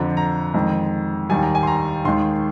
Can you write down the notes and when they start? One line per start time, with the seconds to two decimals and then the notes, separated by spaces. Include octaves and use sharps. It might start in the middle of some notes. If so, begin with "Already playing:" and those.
Already playing: F2 D3 F3 A#5
0.17 A#5
0.54 F2 D#3 G#3
1.30 D#2 D#3 G3 G#5
1.43 A#5
1.55 G#5
1.63 C6
1.67 A#5
2.05 D#2 D#3 G#3 C6